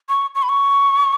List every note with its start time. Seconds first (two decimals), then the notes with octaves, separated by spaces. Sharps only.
0.09 C#6
0.35 C#6
0.43 B5
0.49 C#6